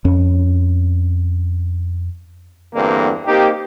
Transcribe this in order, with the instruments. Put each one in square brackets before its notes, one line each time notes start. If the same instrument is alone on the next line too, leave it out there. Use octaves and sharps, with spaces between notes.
[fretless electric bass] F2 C#4
[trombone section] E2 G2 D3 A#3 C4
A#3 C4 D#4 G4